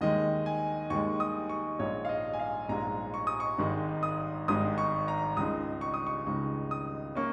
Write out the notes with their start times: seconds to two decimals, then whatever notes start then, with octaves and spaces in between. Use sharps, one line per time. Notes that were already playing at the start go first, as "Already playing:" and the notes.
0.01 D#2 D#3 G#3 D#5
0.46 G#5
0.90 D#2 D#3 G#3 C#6
1.20 D#6
1.49 C#6
1.79 A#1 G#2 G#3 C#5
2.05 F5
2.09 D#5
2.33 G#5
2.40 F5
2.69 A#1 G#2 G#3 A#5
3.14 C#6
3.27 D#6
3.40 C#6
3.58 G#1 G#2 D#3 G#3 D#4
4.03 D#6
4.48 G#1 G#2 D#3 G#3 D#4 D#6
4.78 C#6
5.08 A#5
5.37 C#2 C#3 G#3 D#4 D#6
5.81 C#6
5.94 D#6
6.07 C#6
6.26 C#2 C#3 G#3 D#4 C#6
6.71 D#6
7.15 A#3 C#4 C#6